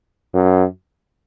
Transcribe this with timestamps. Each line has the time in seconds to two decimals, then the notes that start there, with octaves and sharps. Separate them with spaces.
0.34 F#2